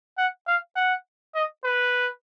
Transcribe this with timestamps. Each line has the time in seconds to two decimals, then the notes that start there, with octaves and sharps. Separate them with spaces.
0.18 F#5
0.47 F5
0.76 F#5
1.35 D#5
1.64 B4